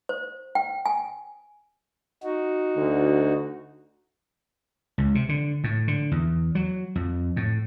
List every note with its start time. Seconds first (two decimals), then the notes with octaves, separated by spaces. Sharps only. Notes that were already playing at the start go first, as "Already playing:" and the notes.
0.09 C5
0.55 G5
0.86 G#5
2.23 D#4 F#4
2.76 D2
4.98 C#2
5.15 C3
5.29 D3
5.64 A2
5.88 D3
6.12 E2
6.55 F#3
6.96 F2
7.36 A2